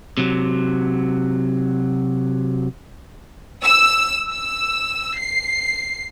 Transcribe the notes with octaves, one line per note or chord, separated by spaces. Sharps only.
C3 F#3
E6
E6
C7